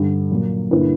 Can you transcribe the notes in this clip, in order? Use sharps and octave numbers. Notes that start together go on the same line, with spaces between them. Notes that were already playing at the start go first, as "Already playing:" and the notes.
Already playing: G2 D3 G3
A#2 F#3 A#3
G2 D3 A#3 E4 B4